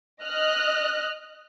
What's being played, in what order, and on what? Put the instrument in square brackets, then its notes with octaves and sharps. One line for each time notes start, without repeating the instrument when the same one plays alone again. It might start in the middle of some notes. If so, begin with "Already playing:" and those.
[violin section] D#5 F6 F#6